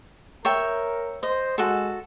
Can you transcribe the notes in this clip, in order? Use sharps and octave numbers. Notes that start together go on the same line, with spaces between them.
A#4 C#5 E5 G5
C5 D#5
G#3 F#4 A4